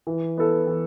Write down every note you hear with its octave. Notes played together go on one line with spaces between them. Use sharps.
E3
B3 E4 A4
E3